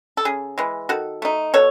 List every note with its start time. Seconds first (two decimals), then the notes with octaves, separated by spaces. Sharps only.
0.17 A4
0.25 C#3 G#4
0.58 E3 G#3
0.89 D#3 F#4 A4
1.22 A3 D#4
1.54 B2 A4 C#5